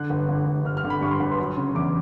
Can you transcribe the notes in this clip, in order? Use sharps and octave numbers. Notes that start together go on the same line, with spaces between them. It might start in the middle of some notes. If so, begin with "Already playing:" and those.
Already playing: D3 F#6
G1
D3
G1
G1 F6
F6
D3
B5
G2 C#6
C6
G1 B5
C6
F#3
C#3
E2 D6